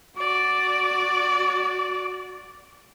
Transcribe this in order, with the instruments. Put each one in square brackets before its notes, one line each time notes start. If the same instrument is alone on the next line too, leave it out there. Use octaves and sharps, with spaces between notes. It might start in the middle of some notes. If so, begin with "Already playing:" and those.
[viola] F#4 D5